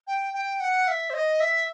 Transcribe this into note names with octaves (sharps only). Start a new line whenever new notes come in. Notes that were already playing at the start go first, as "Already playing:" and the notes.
G5
G5
F#5
E5
C5
D#5
E5